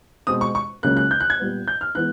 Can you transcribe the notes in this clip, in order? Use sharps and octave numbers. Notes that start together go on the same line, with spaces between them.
B2 G#3 C4 D#6
C#6
C#6
C#2 C#3 F#3 A#3 C#4 F#6
F#6
G6
F#6
G#6
A#2 G3 B3
G6
F6
E3 G#3 B3 F#6